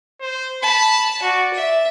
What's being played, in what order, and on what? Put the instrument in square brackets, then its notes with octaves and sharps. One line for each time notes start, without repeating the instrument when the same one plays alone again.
[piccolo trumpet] C5
[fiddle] A5 [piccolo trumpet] B5
[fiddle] F#4 [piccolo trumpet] D5
[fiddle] E5